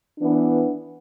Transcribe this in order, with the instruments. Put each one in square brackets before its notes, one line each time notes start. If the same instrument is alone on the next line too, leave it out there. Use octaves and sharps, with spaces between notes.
[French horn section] E3 B3 D4